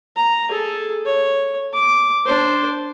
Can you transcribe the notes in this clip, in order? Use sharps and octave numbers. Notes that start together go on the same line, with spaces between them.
A#5
G#4 A4
C#5
D6
D4 C5